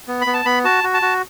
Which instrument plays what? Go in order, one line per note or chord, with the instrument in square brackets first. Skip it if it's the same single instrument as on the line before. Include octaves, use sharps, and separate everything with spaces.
[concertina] B3
B5
B3
A5
B3 B5
F#4 A5
F#4
A5
F#4